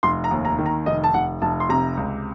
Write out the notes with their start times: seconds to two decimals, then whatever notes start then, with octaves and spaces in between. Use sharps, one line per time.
0.03 F1 C6
0.24 A#5
0.31 D#2
0.45 A#5
0.58 D#3
0.66 A#5
0.86 F1 D#5
1.04 A5
1.14 F1 F#5
1.42 F1 A5
1.60 C6
1.69 C3 A#5
1.97 C#2